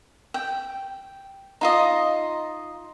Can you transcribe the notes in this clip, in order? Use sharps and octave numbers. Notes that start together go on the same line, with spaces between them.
G5
D#4 F4 D#5